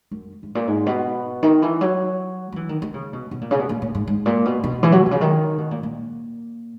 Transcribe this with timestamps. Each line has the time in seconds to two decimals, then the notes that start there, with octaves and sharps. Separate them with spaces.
0.11 F#2
0.43 G#2
0.55 A#2
0.67 G#2
0.86 B2
1.43 D#3
1.62 E3
1.81 F#3
2.52 F#3
2.56 E3
2.69 D#3
2.82 D#3
2.94 C#3
3.13 B2
3.31 B2
3.41 A#2
3.51 C#3
3.60 B2
3.69 A#2
3.82 A#2
3.95 G#2
4.07 G#2
4.26 A#2
4.45 B2
4.64 B2
4.83 E3
4.92 F#3
5.06 B2
5.11 C#3
5.21 D#3
5.58 B2
5.71 A#2
5.83 A#2